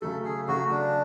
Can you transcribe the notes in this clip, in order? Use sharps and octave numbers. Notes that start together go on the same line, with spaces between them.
C#3 F#3 A3 A4
G#4
C#3 F#3 A3 F#4
D4